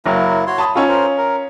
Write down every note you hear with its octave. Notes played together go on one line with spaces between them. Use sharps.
F#1 F#3 A#3 E4
F#4 C#5 C6
A5 B5 D#6
C#4 D#4 F4 F#4 A4
A#4 C5
A#4